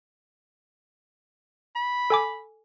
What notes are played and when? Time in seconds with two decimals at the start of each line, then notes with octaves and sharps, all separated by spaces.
1.76 B5
2.10 A4 G#5 D6